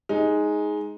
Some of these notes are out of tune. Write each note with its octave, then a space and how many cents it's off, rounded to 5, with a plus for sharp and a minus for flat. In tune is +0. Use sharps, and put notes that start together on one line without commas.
G#3 +5 D#4 +5